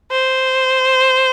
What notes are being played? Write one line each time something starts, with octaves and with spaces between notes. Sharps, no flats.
C5